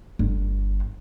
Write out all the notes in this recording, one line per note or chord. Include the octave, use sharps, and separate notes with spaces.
G1